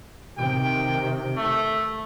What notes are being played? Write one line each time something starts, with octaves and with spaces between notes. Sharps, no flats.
C3 D#3 G5
A3